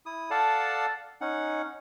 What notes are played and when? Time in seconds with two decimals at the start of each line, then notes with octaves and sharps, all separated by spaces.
0.06 E4 D#6
0.31 A4 D5 F5 F#5 A5
1.21 C#4 D#4 F#5